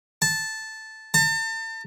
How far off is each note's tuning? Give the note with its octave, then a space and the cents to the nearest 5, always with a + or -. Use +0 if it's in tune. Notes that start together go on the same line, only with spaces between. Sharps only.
A5 -5
A5 +35